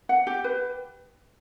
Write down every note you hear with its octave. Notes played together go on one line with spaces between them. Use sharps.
F#5
G4
B4